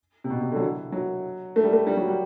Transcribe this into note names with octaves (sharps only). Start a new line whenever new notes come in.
C3
B2
C3
D3
F#3
E3
F#3
A3
G3
A3
G3
F#3
G3